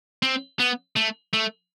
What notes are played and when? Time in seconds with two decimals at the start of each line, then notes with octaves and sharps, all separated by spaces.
0.22 C4
0.59 B3
0.96 A3
1.33 A3